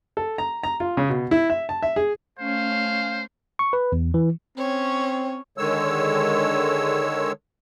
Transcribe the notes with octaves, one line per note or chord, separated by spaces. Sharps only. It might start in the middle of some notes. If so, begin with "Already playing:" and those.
A4
A#5
A#5
F4
C#3
B2
E4
E5
A5
E5
G#4
A3 C#4 C5 F5
C#6
B4
E2
E3
C4 C#4 C#5
D3 D#3 G#3 C#5 E6